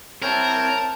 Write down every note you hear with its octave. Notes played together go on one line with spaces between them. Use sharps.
C4 E4 A#4 C#5 G5 A5